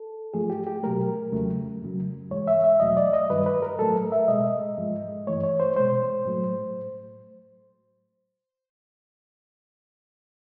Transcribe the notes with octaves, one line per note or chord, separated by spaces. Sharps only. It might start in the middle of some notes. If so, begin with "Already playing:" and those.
Already playing: A4
G#2 F3 A3 G#4
G4
G4
B2 F#3 A3 A#4
E2 C#3 F#3 A3
F2 C#3 F#3
G#2 E3 G#3 C#5
E5
E5
E2 B2 F#3 A3 D#5
D5
D#5
G2 D#3 G3 B4
B4
A#4
A2 F#3 A3 A4
A#4
E5
B2 G#3 D#5
G#2 F3 G#3
G2 E3 A3 C#5
C#5
C5
B2 G#3 C5
A2 F#3 A3